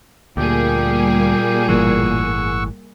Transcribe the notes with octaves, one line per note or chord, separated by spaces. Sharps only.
D2 A#2 G3 A#3 G4 G#4 G5
G1 A2 E3 F#5 C#6 E6